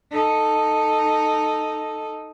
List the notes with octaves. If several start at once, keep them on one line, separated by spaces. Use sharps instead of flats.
D#4 A4